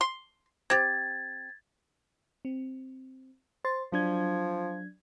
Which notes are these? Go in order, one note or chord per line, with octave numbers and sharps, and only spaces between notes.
C6
C4 G4 G#6 A6
C4
C5 C6 A6
F3 F#3 D4 G#6